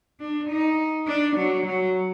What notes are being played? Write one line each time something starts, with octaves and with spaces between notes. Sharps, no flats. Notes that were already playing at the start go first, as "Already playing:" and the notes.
D4
D#4
D4
F#3
F#3